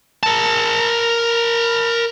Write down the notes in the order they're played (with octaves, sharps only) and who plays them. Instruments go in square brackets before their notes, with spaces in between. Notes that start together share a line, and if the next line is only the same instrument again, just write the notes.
[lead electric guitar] A#4 A5